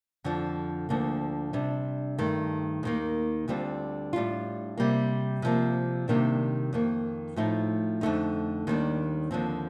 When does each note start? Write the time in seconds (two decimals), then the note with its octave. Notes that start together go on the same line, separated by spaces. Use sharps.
0.24 F2 D3 F3
0.89 D2 D3 F3 A#3
1.53 C3 G3 D4
2.19 G2 D#3 A3
2.83 D#2 D#3 A#3
3.48 D2 D3 G3 C4 F4
4.13 A2 G3 D4 F4
4.77 C3 G3 A#3
5.42 C3 F3 A#3
6.08 C3 D#3 G3 A#3 D4
6.73 F2 D#3 A#3
7.36 A2 F3 A3 D#4
8.01 F2 D3 A3 D#4
8.67 D#2 D#3 G3 D4
9.31 D#2 D3 F3 C4